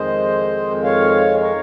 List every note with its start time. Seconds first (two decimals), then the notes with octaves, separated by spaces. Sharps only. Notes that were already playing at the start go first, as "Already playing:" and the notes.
Already playing: F2 D#3 G#3 C5 D#5
0.84 C#5 F5
1.40 A#4 C#5